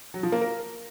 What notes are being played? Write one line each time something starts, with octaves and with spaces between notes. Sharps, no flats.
F#3
F3
A#3
A#4